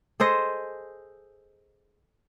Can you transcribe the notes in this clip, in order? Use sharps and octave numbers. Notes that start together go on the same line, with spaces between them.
G#4 A4 C5 D#5